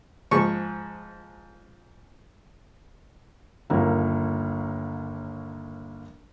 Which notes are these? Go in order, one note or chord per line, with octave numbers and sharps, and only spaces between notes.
G#2 F3 G#3 C#6
G1 D#2 A#3